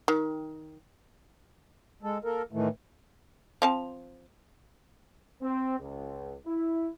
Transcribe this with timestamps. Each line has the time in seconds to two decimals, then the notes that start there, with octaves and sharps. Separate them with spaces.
0.08 D#3
2.03 G#3 A4
2.24 A#3 A4 A#4
2.52 A2 D#3 E3 A3
3.62 F3 C4 A5
5.41 C4
5.79 C#2
6.46 E4